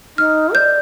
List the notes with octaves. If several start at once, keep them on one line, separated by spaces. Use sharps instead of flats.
D#4 F6
D5 G6